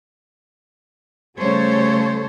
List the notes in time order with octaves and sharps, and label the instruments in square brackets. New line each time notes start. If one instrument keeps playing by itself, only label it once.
[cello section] C#3 G3 A3 A4 C5 C#5